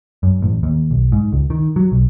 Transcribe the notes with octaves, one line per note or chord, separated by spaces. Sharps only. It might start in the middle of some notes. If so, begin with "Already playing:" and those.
F#2
A1
D#2
B1
G#2
C#2
D#3
F#3
B1